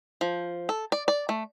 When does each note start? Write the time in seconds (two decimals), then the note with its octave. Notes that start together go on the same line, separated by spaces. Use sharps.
0.21 F3
0.69 A4
0.92 D5
1.08 D5
1.29 A3